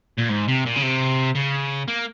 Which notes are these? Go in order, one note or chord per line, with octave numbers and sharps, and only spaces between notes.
A#2
G#2
C3
A#2
C#3
C3
C#3
A#3